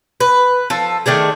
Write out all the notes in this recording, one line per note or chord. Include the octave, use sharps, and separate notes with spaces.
B4
F3 A4
D#3 A3 D4 G#4